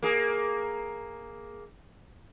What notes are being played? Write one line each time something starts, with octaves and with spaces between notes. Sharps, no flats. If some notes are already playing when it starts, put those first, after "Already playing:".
A#3 G#4